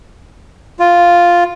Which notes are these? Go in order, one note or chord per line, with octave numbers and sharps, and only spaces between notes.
F4